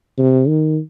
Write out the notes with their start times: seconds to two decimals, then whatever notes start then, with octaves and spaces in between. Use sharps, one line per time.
0.17 C3
0.48 D#3